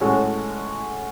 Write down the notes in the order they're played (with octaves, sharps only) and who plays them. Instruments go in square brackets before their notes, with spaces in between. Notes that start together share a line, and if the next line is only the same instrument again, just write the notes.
[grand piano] A2 G#3 C#4 F#4 A4